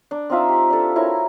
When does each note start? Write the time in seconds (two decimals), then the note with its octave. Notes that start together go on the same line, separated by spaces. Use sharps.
0.11 D4
0.30 C4 D#4 F4 E5
0.49 G4
0.70 D4 A4
0.96 E4 F#4 A#4 C#5